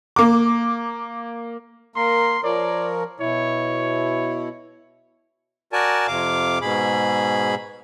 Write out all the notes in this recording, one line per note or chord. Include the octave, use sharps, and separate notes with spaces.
A#3 D6
A#3 A#4 C6
F3 A#4 C#5 D5
B2 E4 C#5
F#4 A#4 D5 G#5 A5
F2 C3 F5 D6
G#2 B2 G#4 B5